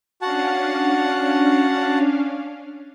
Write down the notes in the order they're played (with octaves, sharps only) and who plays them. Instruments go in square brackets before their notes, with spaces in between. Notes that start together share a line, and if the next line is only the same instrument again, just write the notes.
[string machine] C#4 D4 F5 [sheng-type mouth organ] F#4 F#5 A5